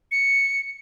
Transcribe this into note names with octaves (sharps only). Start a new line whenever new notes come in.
C#7